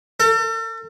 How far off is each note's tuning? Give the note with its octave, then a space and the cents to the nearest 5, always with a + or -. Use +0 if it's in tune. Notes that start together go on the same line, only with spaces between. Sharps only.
A4 +40